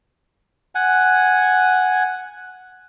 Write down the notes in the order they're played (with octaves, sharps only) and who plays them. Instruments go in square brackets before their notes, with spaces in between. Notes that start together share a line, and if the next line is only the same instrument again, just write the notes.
[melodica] F#5 G#5